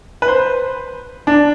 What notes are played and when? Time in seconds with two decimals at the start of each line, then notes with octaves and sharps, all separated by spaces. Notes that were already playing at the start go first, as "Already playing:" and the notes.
0.22 B4
0.28 C5
1.27 D4